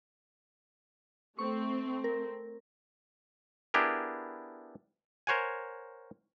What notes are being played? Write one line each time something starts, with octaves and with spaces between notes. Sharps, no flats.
A3 C4 C#6
A#4
B3 D4 E4 G4 G#4 A#4
A#4 C5 C#5 F#5 G#5